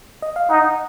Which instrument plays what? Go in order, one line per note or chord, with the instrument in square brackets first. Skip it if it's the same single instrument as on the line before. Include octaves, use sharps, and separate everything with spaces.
[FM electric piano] D#5
F5
[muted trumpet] D#4 [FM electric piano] F#5